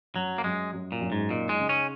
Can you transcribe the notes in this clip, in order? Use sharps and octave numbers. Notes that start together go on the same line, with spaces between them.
F#2 F#3
A#3
F#2 G#3
F#2
A#2
F#2
G#2
A#2 D#4
G#3
C#3
C#4